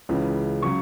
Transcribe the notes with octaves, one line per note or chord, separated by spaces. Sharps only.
C#2 C#3 E3
C#3 F#3 C#6